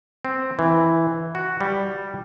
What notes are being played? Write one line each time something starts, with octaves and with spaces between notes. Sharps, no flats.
C4
E3
F#4
G3